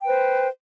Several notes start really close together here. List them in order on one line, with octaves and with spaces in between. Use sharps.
G5 B4 C5